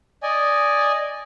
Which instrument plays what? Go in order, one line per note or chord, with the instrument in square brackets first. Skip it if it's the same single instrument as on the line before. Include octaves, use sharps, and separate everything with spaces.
[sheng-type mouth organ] D5 D#5 G#5